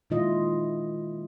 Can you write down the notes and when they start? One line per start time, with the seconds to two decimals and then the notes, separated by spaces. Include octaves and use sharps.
0.10 A#2 D#3 G#3 E4 F4 D#5